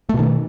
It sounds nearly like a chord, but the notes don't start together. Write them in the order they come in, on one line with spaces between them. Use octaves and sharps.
A3 B2 D#3